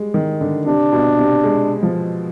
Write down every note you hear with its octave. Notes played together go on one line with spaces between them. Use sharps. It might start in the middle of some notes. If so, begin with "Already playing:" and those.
Already playing: G3 G#3
D#3
D3
C3 D4
B2
C3
G#3
F3